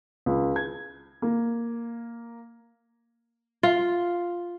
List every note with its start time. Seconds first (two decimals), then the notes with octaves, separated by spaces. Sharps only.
0.26 C#2
0.56 G#6
1.22 A#3
3.63 F4